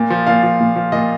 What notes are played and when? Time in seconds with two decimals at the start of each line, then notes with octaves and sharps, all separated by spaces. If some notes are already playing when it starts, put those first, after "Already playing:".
Already playing: A#2
0.10 F3
0.26 A#2 F5
0.43 F3
0.60 A#2
0.76 F3
0.92 A#2 D#5